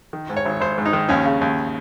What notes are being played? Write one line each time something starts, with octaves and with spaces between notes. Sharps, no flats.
D#3
G#2
C#5
G#1
G#1 C5
G#2
D#4
D#3
D#2 C#4
C#3
D#2